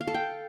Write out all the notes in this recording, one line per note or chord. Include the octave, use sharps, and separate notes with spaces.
F5
A4
G5